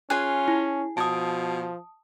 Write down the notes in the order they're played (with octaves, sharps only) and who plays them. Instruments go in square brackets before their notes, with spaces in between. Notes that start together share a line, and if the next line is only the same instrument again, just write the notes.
[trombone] C#4 [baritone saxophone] F4 [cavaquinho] G#4 G#5 [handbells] F#6
[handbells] E4
[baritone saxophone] B2 [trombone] F3 [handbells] A5 D#6